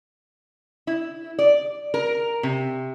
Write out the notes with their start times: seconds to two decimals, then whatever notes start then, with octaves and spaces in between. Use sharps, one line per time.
0.87 E4
1.39 D5
1.94 A#4
2.43 C3